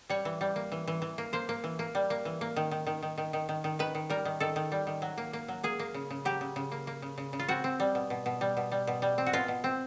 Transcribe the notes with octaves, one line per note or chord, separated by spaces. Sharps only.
G3 C#5
E3
G3
A#3
E3
E3
E3
A#3
A#3 C5
A#3
E3
A#3
G3
A#3
E3
A#3
D#3
D#3
D#3
D#3
D#3
D#3
D#3
D#3
D#3 B4
D#3
G3 A#4
D#3
D#3 A4
D#3
G3
D#3
F#3
A#3
A#3
F#3
A#3 G#4
A#3
C#3
C#3
F#3 G4
C#3
C#3
A#3
A#3
C#3
C#3
C#3
F4
C4 F#4
C4
G3
B2
B2
B2
G3
B2
G3
B2
G3
C4
F#4
B2 F4
B2
C4